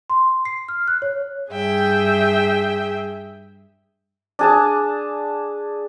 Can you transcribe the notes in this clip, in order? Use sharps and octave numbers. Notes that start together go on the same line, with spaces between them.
C6
C7
F6
F#6
C#5
G2 G#4 E5 G5
D4 G#4 A5